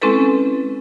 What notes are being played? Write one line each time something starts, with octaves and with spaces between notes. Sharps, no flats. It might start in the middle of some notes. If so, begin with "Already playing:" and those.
G#3 C4 C#4 E4 A4 B4